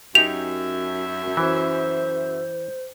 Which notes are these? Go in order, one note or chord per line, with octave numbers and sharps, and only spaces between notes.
F#2 D#4 G4 E5 F7
E3 C5